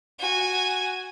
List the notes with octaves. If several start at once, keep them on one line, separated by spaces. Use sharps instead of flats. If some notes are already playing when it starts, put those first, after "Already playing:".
F#4 G#5